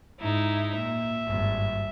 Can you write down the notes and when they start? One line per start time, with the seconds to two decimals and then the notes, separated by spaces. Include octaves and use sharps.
0.20 G#2 D#4 E4
0.75 A#2 E5
1.25 G#1 G2